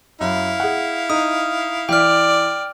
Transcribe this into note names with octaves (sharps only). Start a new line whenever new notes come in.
F#2 E4 F5
G#4 F#5
D#4 D#6
E3 D5 G5 F6